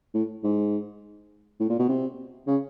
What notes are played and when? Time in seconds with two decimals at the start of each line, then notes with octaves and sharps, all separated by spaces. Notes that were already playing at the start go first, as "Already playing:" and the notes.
0.14 A2
0.44 G#2
1.60 A2
1.70 A#2
1.79 B2
1.89 C3
2.47 C#3